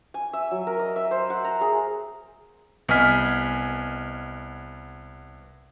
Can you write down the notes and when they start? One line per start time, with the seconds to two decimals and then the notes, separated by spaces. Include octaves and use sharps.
0.14 G#5
0.33 E5
0.51 F#3
0.67 A#4
0.79 D#5
0.96 E5
1.11 C5
1.30 F#5
1.45 A#5
1.61 G#4
2.89 C2 B3 D#5 G#5 F6 B6